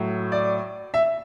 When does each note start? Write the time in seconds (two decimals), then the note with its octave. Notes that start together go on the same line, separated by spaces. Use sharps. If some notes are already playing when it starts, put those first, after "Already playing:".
Already playing: A2 F#3
0.32 D5
0.94 E5